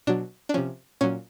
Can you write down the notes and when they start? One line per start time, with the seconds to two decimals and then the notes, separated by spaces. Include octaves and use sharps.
0.07 B2 F#3 D4
0.49 D4
0.54 C3 F3 C#4
1.01 A#2 F#3 C#4